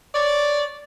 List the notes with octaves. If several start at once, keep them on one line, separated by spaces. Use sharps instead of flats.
C#5 D5